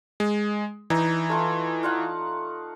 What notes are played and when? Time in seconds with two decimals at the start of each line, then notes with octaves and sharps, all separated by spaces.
0.20 G#3
0.90 E3 D#4
1.29 A3 F4 F5
1.83 F4 F5 F#5